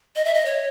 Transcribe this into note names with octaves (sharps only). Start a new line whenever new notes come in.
D#5
E5
D#5
C#5